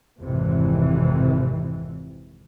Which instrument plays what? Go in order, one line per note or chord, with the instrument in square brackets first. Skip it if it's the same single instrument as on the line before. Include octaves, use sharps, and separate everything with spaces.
[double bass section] G#1 F2 C3 E3